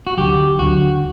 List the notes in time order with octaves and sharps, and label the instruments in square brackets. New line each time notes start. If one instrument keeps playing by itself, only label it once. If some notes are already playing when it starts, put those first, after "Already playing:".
[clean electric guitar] F#4
[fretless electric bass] D2 D3 F#3 [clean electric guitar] G4
[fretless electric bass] D2 D3 F#3 [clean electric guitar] F#4